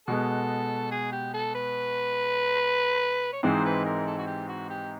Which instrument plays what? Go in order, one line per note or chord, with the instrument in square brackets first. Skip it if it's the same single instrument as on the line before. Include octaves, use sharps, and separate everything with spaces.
[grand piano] B2 G#3 B3 [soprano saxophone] A4
[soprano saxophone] G#4
G4
A4
B4
C#5
[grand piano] G#2 E3 G#3 C4 D#4 [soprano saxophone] C5
[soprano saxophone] B4
A#4
A4
F#4
G4
F#4
G4